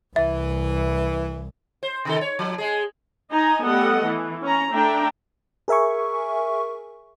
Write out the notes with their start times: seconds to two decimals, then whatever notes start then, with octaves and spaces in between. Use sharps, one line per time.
0.16 C2 E3 E5
1.83 C5
2.05 C3 D#3 A4
2.21 C#5
2.39 F3
2.58 G#3 G#4
3.32 D#4 D#5 G#5 A#5
3.64 G3 A3 B3 A4 D#5 F#5
4.05 E3
4.42 C#4 A#5
4.72 A3 D4 E5 G5 A#5
5.68 G#4 A#4 E5 G#5 C#6